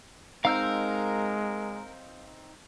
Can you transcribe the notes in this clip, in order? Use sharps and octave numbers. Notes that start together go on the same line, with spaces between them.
G#3 C4 D#4 A#4 F5 E6 G6